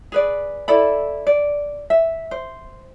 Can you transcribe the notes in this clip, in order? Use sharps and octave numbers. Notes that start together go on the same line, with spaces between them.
G#4 B4 D5
E4 A4 D5 B5
D5
E5
C5